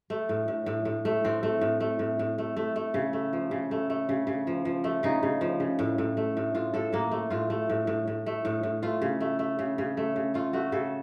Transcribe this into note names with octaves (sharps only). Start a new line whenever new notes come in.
A3
A2
A2
A2
A2
A3
A2 C4
A3
A2
A3
A2
A2
A3
A3
A3
C#3
A3
F3
C#3
A3
A3
C#3
C#3
F3
F3
A3
C#3 D#4
C#3
F3
C#3
A2
A2
A3
A2
A2 F4
A2 A4
A2 A#3
A3
A2 F4
A3
A2
A2
A2
A3
A2
A2
A3 F4
C#3
A3
A3
C#3
C#3
A3
C#3
A3 F4
A3 F#4
C#3 A4